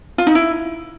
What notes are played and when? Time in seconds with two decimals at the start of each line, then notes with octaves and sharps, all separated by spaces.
0.18 F4
0.27 D#4
0.35 E4